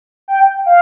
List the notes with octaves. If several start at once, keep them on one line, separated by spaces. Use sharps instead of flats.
G5
F5